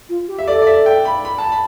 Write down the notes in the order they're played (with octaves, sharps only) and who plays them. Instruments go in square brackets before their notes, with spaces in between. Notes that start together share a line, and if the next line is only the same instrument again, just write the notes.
[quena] F4
G4
[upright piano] E5
[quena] A4 [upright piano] D5
[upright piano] D5
E5
G5
B5
B5
A5
B5